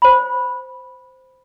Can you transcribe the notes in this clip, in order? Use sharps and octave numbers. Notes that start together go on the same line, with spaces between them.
C5 B5